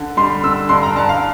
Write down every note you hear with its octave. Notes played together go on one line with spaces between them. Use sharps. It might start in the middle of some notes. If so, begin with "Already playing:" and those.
Already playing: D3
G3 C6
D3 E6
G2 C6
A#5
G2 A5
F5